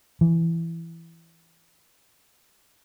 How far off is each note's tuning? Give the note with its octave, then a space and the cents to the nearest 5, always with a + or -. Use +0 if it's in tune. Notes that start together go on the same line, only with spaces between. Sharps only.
E3 +10